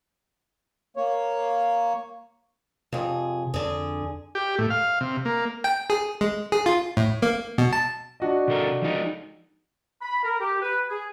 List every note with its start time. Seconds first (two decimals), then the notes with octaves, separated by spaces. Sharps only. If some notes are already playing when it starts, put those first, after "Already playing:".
0.97 A#3 C#5
2.93 F2 C3 G#4
3.54 F2 D3 G#4
4.35 G4
4.58 A2
4.70 F5
5.01 C3
5.25 A#3
5.64 G5
5.90 G#4
6.21 G#3
6.52 G#4
6.66 F4
6.97 A2
7.22 A#3
7.58 B2
7.73 A5
8.20 D4 F#4 D#5
8.48 C3 A4 A#4
8.82 F3 G#3 D#4
10.02 B5
10.24 A#4
10.41 G4
10.62 B4
10.90 G#4